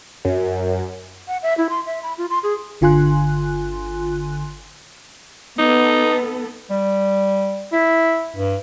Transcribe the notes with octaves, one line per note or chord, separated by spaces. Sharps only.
F#2
F#5
E5
E4
C6
E5
B5
F4
C6
G#4
G1 D3 F4 G#5 C6 F#6
B3 D#4 A4
G3
E4
G2